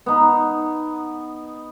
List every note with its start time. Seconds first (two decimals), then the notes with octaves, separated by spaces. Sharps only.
0.06 B3 D#4